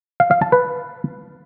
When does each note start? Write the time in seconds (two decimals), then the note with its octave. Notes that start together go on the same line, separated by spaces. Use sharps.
0.20 F5
0.31 F5
0.42 A5
0.52 B4